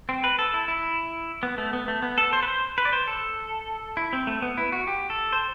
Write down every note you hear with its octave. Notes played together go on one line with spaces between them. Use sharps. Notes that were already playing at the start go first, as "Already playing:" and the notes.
C4
B4
A4
E4
E4
B3
A3
B3
A3
B3
A4
C5
B4
C5
B4
D5
C5
A4
E4
C4
A3
B3
E4
F#4
G4
A4
C5